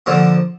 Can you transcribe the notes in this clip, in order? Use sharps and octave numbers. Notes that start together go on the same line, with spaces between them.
D3 F3 A#3